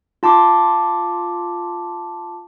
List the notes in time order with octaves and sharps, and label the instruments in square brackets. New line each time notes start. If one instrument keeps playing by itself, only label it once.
[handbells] F4 A5 C6 D6